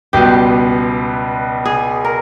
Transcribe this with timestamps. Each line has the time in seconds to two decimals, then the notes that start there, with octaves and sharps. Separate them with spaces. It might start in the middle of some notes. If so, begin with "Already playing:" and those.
0.13 C#2 B2 G3 B3 G4
1.66 G#4
2.05 A#4